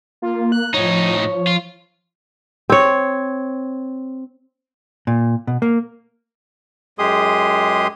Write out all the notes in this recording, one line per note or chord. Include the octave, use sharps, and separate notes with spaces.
A#3 F4
F#6
A2 F3 D#4 C#5
F4
C4 C#5
A#2
B2
A#3
F#2 G#3 G4 G#4 C6 D#6